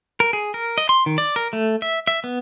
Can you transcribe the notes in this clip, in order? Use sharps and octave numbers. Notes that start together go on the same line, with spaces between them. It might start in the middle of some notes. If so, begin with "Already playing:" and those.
A#4
G#4
A#4
D#5
C6
D#3
D5
A#4
A3
E5
E5
B3